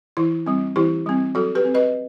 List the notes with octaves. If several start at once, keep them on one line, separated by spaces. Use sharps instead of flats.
E3 E4
G3 C4
E3 E4 G4
G3 C4
F#3 F#4 A4
G4 B4
C4
B4 D#5